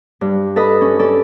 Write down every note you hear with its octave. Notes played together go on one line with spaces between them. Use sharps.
G2
A4 B4 D#5 B5
C#4
C#4 A4 D5